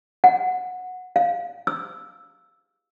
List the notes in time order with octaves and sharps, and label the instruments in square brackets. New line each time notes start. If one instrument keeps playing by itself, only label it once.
[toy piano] F#5
F5
E6